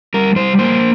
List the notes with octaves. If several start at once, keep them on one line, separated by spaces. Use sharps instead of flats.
G3 A#4
G3 C5
A#3 C5